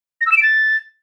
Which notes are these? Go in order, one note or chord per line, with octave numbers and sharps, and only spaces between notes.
A#6
E6
E7
D7
A6